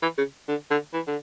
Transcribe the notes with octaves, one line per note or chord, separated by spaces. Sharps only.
E3
C#3
D3
D3
E3
D3